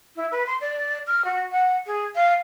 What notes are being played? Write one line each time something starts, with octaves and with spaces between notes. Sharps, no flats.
E4
B4
C6
D5
F6
F#4
F#5
G#4
F5